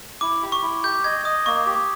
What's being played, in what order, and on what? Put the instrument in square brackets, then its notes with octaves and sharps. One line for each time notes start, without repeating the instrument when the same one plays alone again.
[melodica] E4 [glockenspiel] D6
[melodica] G4
[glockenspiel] C#6
[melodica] E4
[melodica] G4 [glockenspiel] G6
[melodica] D#5 [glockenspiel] G#6
[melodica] D#5 [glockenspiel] D#6
[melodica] A#3 [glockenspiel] C#6
[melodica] G4